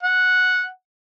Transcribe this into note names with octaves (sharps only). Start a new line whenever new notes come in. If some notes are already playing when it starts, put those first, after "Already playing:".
F#5